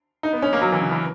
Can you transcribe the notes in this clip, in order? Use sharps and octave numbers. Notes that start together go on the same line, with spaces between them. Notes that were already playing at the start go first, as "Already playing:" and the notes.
D#4
B3
C#4
A#3
F#3
E3
C#3
E3